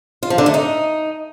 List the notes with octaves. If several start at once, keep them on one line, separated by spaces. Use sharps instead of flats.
F4
F3
D3
A3
D#4